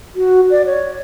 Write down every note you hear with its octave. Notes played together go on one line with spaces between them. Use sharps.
F#4
D5
C#5